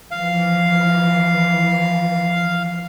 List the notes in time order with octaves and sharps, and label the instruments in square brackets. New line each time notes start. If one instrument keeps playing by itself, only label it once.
[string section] E3 F3 [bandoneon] F5